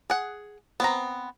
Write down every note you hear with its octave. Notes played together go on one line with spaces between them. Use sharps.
G#4 F#5
B3 C4 A#5